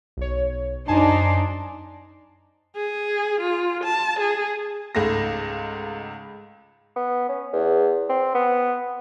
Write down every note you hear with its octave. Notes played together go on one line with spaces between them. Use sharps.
B1 C#5
F#2 D4 D#4 C5 G#5 A5
G#4
F4
A5
G#4
C#2 G#2 A3 A#6
B3
C#4
E2
C4
B3